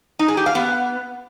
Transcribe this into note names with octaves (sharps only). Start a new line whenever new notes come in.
D#4
G#4
G4
F5
B3